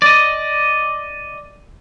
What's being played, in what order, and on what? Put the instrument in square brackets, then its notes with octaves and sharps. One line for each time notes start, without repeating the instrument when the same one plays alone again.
[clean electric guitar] D5 D#5